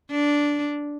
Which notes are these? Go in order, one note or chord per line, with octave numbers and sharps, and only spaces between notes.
D4